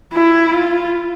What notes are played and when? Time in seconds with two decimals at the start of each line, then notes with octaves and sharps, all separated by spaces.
0.13 E4
0.52 F4